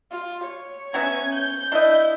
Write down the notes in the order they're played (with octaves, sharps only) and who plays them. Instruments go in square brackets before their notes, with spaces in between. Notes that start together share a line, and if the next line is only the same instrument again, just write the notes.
[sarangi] F4
C#5
[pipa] F#3 B3 E5 [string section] C#4 G#6
[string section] G6
[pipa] D4 D#5 [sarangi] E4